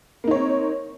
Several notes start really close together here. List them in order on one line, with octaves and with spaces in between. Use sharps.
A#3 D#4 C#5 C4